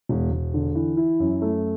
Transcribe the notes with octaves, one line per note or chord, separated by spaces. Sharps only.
E1
E1
D3
E3
E4
F#2
A3